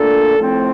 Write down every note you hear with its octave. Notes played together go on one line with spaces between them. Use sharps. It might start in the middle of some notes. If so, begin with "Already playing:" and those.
Already playing: A#2 A3 D4 A4
A2 F3 A3 C4